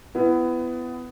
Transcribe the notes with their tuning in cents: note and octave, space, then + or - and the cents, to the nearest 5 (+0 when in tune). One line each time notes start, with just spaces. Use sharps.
B3 +20 E4 +30